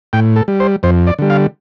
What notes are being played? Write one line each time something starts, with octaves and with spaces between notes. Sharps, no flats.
A2 G5
A4
G3
C5
F2 C5
D5
D3 G3
F5